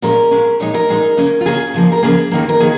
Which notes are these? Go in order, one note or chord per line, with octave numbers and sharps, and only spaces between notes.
A#2 G#3 C#4 A#4
A#2 G#3 C#4
A#2 G#3 D#4 C#5
A#4
A#2 G#3 D#4
C#3 A#3 C#4
F4
C#3 A#3 C#4 G#4
C#3 F3 A#3
A#4
C#3 F3 A#3 G#4
D#2 D#3 A#3
A#4
D#3 A#3 G#4